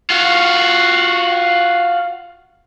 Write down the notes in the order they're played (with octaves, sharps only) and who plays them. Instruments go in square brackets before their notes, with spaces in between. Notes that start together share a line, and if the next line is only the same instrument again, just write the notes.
[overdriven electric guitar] F4 F#4